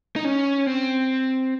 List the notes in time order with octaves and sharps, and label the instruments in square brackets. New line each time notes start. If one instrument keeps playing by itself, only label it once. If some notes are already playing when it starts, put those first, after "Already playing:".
[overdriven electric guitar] D#4
C#4
C4